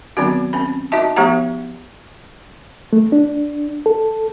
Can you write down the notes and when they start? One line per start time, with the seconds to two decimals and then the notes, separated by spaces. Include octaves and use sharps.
0.17 D#3 F#3 B3 C4 D4 F#4
0.53 C4 C#4 B5
0.92 D#4 F#4 D#5 E5 A5
1.16 F3 A3 B3 G4 F#5 A#5
2.93 A3
3.12 D4
3.86 A4